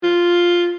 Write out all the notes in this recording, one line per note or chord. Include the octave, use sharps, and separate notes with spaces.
F4